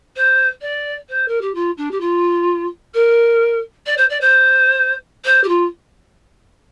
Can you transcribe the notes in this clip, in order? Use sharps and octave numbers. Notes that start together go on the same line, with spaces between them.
C5
D5
C5
A#4
G4
F4
D4
G4
F4
A#4
D5
C5
D5
C5
C5
G4
F4